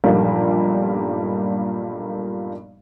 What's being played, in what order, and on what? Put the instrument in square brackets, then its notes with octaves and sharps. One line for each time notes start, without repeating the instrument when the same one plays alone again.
[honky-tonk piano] B1 G2 A#2 F3 G3 A#3